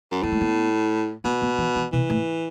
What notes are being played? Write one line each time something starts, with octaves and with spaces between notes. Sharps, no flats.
F#2
A2 B3
A3
B3
B2 B3
B3
E3
E3
B2 E3
A2